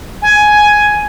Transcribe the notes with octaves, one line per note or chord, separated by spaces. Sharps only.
G#5